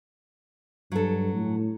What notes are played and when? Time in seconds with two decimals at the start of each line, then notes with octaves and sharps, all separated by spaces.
0.92 G2 F#3 A4
1.33 A2